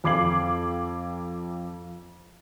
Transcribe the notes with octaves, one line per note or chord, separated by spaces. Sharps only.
F2 F5 D6 G#6 C7 F#7